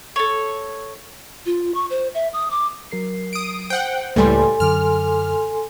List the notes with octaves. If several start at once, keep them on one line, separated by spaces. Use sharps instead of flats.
A4 C#5
F4
C#6
C5
E5
D#6
D6
F#3 A#4 C7
D#6 D7
C5 F#5 G5
C#2 A2 G3 A#3 A4 B4 G#5 C6
F#2 D3 D6 F6